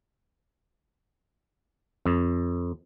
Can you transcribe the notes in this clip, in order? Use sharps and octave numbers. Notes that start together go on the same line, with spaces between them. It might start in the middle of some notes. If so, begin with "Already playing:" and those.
F2